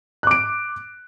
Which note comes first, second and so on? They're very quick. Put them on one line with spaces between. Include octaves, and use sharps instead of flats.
F#6 D6 D7